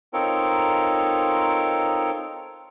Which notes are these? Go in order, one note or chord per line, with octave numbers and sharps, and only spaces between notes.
C4 D#4 F4 A4 A#4 C#5